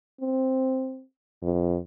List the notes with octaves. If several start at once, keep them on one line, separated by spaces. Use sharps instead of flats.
C4
F2